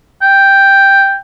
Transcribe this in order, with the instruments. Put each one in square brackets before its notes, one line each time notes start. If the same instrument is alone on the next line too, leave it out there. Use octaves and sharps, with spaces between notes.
[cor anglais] G5